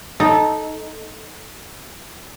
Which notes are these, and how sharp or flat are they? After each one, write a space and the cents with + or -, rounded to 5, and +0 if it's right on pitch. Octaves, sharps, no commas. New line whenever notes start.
D#4 +0 A4 -15